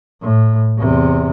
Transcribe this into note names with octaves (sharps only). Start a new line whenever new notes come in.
A2
E2 C3